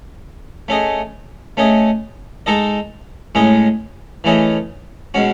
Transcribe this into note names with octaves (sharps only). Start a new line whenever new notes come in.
A3 C#4 G#4 D#5
A3 C#4 G#4 D#5
G#3 D#4 A4 D#5
A2 G#3 C#4 G#4 D#5
E3 A3 C#4 G#4 D#5
B2 G#3 C#4 F#4